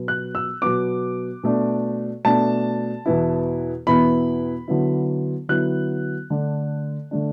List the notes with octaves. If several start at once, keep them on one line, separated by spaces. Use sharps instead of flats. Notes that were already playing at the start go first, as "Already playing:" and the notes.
Already playing: B2 F#3 B3
F#6
E6
B2 F#3 B3 D6
B2 A3 D4
B2 A3 D4 A5
E2 B2 B3 E4
E2 B2 B3 E4 B5
D3 F#3 B3 E4
D3 F#3 B3 E4 F#6
D3 A3 D4
D3 A3 D4